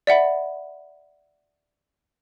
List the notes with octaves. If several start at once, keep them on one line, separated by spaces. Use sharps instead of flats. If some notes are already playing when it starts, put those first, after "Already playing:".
D5 E5 F#5 B5